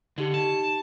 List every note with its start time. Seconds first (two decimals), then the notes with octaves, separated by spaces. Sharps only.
0.18 D3 D#4 G4 C#7
0.34 A5